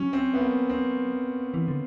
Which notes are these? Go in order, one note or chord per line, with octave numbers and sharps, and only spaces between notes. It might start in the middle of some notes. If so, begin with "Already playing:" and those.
Already playing: F#3 C#4
C4
B3
A#3
C4
E3
D3